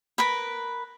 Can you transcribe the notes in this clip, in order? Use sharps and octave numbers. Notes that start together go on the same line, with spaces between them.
A#4 B4 B5